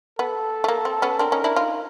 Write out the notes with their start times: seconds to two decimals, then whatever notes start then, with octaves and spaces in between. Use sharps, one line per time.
0.19 B3 A4
0.64 A3
0.68 A#3
0.85 C4
1.02 B3 C#4
1.19 C4 D4 A#4
1.32 C#4 D#4
1.44 D4 E4
1.56 D#4 F4